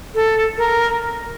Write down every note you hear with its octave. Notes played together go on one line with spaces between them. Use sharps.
A4
A#4